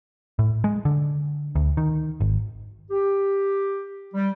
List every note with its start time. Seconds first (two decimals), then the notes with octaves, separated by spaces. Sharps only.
0.39 A2
0.64 G#3
0.85 D3
1.55 D2
1.77 D#3
2.20 G#1
2.91 G4
4.14 G3